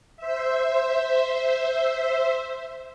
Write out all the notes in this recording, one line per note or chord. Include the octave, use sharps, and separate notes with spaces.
C5 E5